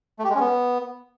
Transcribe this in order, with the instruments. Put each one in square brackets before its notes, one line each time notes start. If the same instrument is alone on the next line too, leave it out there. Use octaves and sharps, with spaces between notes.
[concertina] A3
G4
G#3
C#4
B3